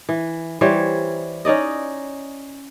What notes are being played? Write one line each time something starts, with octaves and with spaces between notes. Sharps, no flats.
E3
E3 G3 C5 C#5
C#4 D#4 D5 D#5